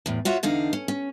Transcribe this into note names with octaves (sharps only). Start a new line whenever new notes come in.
E2 A2
F4 F#4 C#5 E5
E2 D3 D#4 F5
C#4
C#4